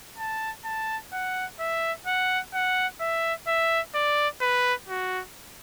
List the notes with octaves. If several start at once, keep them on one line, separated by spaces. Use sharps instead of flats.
A5
A5
F#5
E5
F#5
F#5
E5
E5
D5
B4
F#4